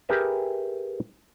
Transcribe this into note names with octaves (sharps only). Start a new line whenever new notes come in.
G4 G#4 A#4 B4 E5